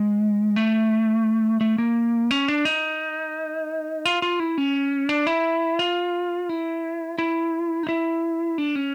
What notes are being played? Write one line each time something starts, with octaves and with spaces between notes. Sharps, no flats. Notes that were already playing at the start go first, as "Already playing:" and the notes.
Already playing: G#3
A3
A3
A#3
C#4
D4
D#4
F4
F4
E4
C#4
D4
E4
F4
E4
E4
D#4
E4
D4
C#4